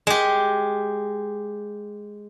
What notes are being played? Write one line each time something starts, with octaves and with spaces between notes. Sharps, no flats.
G#3 G4